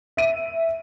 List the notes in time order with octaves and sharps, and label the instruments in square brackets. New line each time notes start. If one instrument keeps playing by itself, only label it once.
[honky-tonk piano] E5 D#7